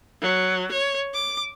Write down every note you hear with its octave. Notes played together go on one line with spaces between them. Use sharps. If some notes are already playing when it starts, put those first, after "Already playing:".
F#3
C#5
D6